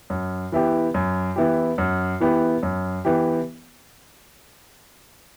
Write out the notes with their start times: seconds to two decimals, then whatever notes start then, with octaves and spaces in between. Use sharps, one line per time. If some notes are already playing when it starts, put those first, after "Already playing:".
0.10 F#2
0.52 E3 B3 E4 G4
0.94 F#2
1.36 E3 B3 E4 G4
1.78 F#2
2.20 E3 B3 E4 G4
2.63 F#2
3.05 E3 B3 E4 G4